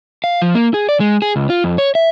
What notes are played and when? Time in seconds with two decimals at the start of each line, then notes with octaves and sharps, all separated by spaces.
0.24 F5
0.42 F3
0.55 A#3
0.74 G#4
0.89 D5
1.00 G#3
1.22 G#4
1.36 C#2
1.50 F4
1.64 F2
1.78 C#5
1.95 E5